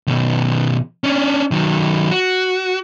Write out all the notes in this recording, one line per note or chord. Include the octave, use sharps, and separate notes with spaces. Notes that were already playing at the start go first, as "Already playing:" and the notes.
B2 D#3
C#4 D4
D#3 F#3
F#4